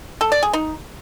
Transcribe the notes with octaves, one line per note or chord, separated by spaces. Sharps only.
A4
D5
G#4
D#4